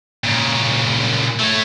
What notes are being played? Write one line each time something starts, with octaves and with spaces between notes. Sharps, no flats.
A#2 C#3
A3 C#5